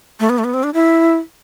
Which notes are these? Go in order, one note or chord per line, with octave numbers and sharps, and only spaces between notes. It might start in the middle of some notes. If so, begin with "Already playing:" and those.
A3
B3
A3
B3
C4
D4
E4